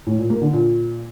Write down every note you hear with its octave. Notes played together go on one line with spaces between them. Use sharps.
A2
A#2
A#3
D3
A#2